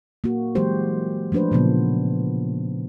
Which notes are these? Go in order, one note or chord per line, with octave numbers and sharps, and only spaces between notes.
A#3 F#4
E3 F#3 G#3 G4 C5
F3 A3 D4 B4 C5
A#2 C#3 F3 A#3 B3